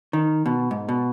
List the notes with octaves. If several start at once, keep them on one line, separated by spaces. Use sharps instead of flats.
D#3
B2
G#2
B2